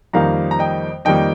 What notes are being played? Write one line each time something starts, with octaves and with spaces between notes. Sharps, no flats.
F2 D#3 G3 A#3 F5 A#5
A#5
D#5 G5
F2 D#3 G3 A#3 D#5 G5